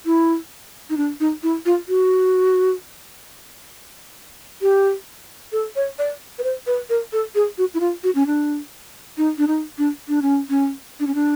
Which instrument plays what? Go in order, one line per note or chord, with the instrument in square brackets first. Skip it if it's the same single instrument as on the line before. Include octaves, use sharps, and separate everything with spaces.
[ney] E4
D#4
D4
D#4
E4
F4
F#4
G4
A4
C#5
D5
B4
C5
B4
A#4
A4
G#4
F#4
E4
F4
F#4
C#4
D4
D#4
D4
D#4
D4
D4
C#4
C#4
D4
C#4
D4